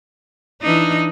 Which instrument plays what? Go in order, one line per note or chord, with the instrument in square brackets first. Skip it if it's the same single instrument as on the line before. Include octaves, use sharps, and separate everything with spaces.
[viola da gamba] E3 D4 [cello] D#4